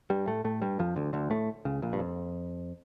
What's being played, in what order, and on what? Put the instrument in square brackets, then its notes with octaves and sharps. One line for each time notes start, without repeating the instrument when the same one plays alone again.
[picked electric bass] G2 G3
A2 A3
A2 A3
G2 G3
F2 F3
D2 D3
D2 D3
A2 A3
C#2 C#3
A#1 A#2
G2
F2